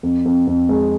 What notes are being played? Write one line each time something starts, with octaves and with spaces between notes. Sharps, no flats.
F2
F2
F2
G#3